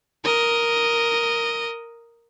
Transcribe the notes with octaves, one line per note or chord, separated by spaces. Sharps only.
A#4 D#5